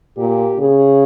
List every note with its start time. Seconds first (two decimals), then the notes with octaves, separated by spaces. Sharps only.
0.18 A#2 G4
0.60 C#3 G#4